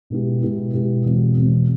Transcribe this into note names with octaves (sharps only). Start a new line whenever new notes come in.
B2 G#3 B3 E4 G4
B2 G#3 B3 E4 G4
B2 G#3 B3 E4 G4
E2 B2 G#3 C4
E2 B2 G#3 C4